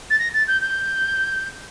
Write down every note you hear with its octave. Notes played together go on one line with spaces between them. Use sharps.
A6
A#6
A6
G6
G6